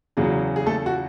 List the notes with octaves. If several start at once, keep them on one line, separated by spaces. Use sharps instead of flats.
E2 C#3 F#3 G#4
G#4
A3 A4
F#4